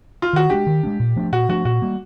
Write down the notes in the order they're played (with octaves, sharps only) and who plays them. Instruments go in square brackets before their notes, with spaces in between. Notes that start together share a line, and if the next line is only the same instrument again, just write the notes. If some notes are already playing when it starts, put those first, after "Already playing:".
[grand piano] F4
[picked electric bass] D#3 [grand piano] F#4
[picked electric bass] G#3 B3 D4 [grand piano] G4
[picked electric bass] D#3
G#3 B3 D4
A#2
F3 A3 D4
[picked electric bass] A#2 [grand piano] F#4
[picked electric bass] F3 A3 D4 [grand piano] F#4
[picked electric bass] A#2 [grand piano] F#4
[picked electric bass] G3 A#3